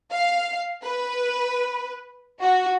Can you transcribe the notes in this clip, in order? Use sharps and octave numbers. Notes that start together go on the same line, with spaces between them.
F5
B4
F#4